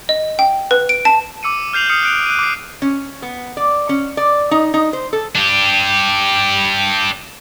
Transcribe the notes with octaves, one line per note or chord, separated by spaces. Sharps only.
D#5
G5
B4
D7
A5
D6 E6 C#7 D#7
F6 G6 C7 F7 F#7
D#6 F6 C7 C#7
F#6 D7 F7
F#6 D#7
D6 C7
C#4
B3
D5
C#4
D5
D#4
D#4
C5
A4
D4 G4